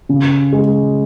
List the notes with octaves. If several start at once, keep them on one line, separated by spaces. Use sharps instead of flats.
C#3
G#3